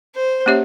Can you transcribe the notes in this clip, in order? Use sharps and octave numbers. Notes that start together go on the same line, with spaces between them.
C5
A#3 C#4 G4 C#5 E5